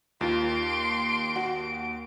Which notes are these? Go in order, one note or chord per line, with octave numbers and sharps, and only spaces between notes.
D#2 F4 C6 D7
F#4